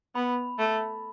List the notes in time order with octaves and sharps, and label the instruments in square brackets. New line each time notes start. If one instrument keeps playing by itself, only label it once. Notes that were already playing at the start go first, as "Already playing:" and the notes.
[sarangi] B3 [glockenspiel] B5
[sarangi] A3